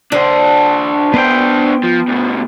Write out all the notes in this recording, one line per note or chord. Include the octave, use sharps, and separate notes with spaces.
D3 D4 C5
B3 D4 C5 G5
F3
D2 B2